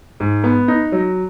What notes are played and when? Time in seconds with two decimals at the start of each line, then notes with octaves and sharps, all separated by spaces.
0.20 G#2
0.44 B3
0.68 D#4
0.92 F#3